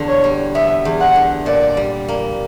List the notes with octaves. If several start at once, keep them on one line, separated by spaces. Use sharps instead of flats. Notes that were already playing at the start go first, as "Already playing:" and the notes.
Already playing: E2 D3
C#5
G3
B3 E5
E2
F#5
D3
A#2 D5
G3
A#3